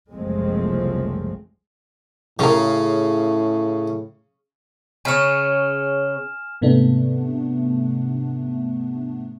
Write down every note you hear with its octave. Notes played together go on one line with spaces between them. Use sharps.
F#1 C2 F3 G#3 A3 C4
A2 C#3 G4 A#4
C#3 C#4 G#5 F6 E7
G#2 C3 A3 B3 D4